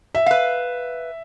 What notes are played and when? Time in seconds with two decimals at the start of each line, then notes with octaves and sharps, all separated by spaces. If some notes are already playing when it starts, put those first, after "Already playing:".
0.15 E5
0.26 B4 F5